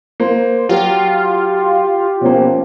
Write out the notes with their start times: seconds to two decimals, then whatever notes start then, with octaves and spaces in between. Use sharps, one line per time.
0.20 A#3 C5
0.69 F#3 F4 G4
2.21 B2 F3 A#3 C#4